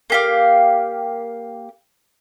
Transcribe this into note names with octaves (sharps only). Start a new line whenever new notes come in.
A#3 G4 F5